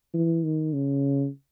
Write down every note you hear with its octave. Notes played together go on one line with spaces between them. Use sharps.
E3
D#3
C#3